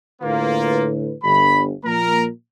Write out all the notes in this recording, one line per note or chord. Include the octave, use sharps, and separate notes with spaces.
A2 D3 A#3 F4 B4
G1 B5
A#2 F3 A#3 A#4 A#5